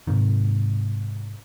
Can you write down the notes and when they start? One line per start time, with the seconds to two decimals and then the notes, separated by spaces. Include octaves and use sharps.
0.07 G#2 C3 D#3